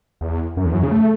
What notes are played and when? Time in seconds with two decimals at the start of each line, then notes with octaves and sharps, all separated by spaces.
0.21 E2
0.57 F#2
0.65 E2
0.74 F#2
0.83 C#3
0.92 A3